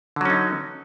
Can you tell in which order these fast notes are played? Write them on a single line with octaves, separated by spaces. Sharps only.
D3 F#3 C#4 D#4